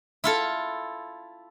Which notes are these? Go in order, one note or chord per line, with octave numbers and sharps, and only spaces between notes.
E4 F4 A4